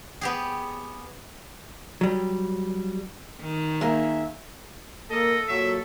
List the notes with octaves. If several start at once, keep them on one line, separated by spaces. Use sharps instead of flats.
B3 G4 G#4
F#3 G3
D#3
G#3 A#3 D#4 E5
A#3 A4 D#5
A#2 F#3 E5